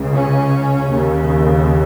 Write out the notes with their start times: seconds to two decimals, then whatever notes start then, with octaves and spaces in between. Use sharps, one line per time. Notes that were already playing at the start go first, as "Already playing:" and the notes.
Already playing: C#2 C#3
0.12 C#4
0.89 D#2 C#3